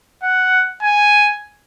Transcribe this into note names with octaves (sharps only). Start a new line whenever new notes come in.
F#5
G#5